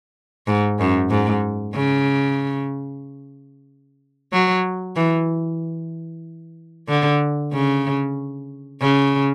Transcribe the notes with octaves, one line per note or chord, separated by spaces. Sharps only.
G#2
F#2
G#2
C#3
F#3
E3
D3
C#3
C#3